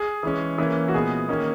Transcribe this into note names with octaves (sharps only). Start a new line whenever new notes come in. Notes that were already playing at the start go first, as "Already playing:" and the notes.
Already playing: G#4
E3 G#3 C#4
E3 A#3 C#4
F#4
A#2 G#3 B3 G#4
D#3 A#3 C#4